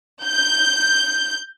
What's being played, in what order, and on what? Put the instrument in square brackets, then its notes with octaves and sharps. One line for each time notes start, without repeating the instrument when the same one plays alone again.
[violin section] G6